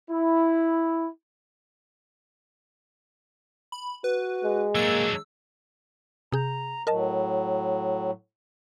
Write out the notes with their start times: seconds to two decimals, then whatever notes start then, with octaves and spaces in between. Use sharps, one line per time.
0.11 E4
3.72 B5
4.04 F#4 B4
4.44 G#3
4.75 F#3 A#3 D4 E6
6.32 C3 G#4 A#5 G6
6.87 A2 F#3 A#4 D#5 A5